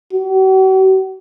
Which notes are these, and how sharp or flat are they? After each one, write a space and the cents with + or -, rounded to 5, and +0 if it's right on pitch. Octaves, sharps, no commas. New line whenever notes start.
F#4 +45